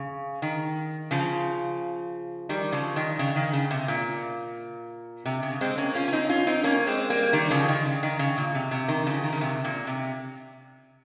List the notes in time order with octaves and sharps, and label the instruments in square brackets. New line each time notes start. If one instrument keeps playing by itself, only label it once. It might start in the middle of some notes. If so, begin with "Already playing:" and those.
Already playing: [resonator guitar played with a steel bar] C#3
D#3
C#3 F3
D#3 G3
C#3 F3
D#3
C#3
D#3
C#3
C3
A#2
C3
C#3
G#3 C4
A#3 C#4
C#4 F4
C#4
C4 D#4
C#4 F4
C4 D#4
A#3 C#4
G#3 C4
G3 A#3
D#3 G3
C#3 F3
D#3
C#3
D#3
C#3
A#2
C3
C3
D#3
C#3 F3
D#3
C#3
C3
A#2
C3